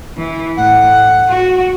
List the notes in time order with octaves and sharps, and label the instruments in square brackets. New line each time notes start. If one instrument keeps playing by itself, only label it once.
[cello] E3
[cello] A2 [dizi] F#5
[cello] F#4